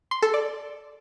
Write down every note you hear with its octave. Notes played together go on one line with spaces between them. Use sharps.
C6
A4
D5